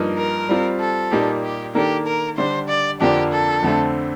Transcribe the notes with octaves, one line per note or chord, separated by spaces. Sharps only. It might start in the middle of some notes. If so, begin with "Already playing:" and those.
Already playing: G2 F3 A#3 D#4
A#4
G3 C4 F4
A4
A#2 G3 A#3 D#4 G4
G4
D#3 A#3 D4 G4 A4
A#4
D3 G3 D4 G4 C5
D5
F2 D3 F3 A#3 D4 G4
A4
F2 D3 A3 C4